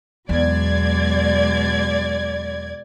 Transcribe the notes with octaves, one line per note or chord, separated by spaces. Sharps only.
E2 B2 F#3 G#3 D5 G#6